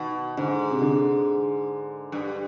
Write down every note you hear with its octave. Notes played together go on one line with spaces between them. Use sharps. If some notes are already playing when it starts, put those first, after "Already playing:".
Already playing: B2 D#3
G#2 D3
C3
D3
G2